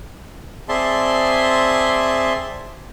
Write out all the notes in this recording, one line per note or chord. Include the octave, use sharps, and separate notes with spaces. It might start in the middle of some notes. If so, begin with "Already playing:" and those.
C4 G#4 D5 E5 A5 C6